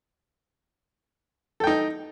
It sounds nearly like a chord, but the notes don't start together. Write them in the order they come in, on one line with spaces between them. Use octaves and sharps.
A4 G5 D#4